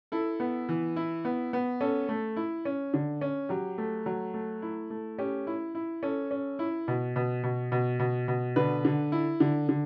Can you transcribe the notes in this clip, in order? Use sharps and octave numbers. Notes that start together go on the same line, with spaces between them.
E4 A4
B3
E3
E4
B3
B3
C#4 A4
A3
E4
C#4
D3
C#4
F#3 G4
A3
F#3
A3
E4
A3
C#4 G4
E4
E4
C#4 A4
C#4
E4
B2
B2
B2
B2
B2
B2
D3 B4
D3
E4
D3
D3